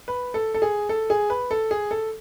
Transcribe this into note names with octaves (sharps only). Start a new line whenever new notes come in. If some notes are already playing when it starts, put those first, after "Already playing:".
B4
A4
A4
G#4
A4
G#4
B4
A4
G#4
A4